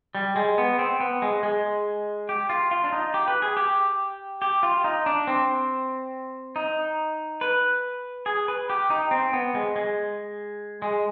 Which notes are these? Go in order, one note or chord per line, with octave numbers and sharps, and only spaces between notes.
G3
G#3
B3
C4
B3
G#3
G#3
G4
F4
F4
D4
D#4
G4
B4
G#4
G4
G4
F4
D#4
D4
C4
D#4
B4
G#4
B4
G4
D#4
C4
B3
G#3
G#3
G#3